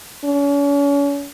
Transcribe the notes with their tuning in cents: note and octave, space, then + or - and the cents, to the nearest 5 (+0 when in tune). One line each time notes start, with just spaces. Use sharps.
C#4 +40